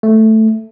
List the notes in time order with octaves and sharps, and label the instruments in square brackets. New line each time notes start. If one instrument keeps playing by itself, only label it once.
[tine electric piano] A3